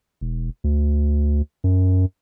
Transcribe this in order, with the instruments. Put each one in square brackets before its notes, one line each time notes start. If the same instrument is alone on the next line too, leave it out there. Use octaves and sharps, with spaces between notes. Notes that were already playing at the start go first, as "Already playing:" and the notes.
[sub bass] E1
D2
F#2